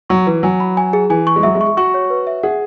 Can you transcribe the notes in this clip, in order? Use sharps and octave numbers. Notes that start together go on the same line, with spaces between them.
F#3 C#6
E3 B4
F#3 G#5
B5
G#5
G#4
E3 G#5
C#6
G#3
F#3 E5
G#3
C#6
F#4 C#6
C#5
B4
E5
G#4 F#5